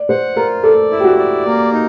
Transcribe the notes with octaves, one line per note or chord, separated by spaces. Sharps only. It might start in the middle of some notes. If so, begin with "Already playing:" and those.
Already playing: D5
C5 F#5
F4 A#4
A4 D5
E4
G4
F#4
D5
A#3
D#4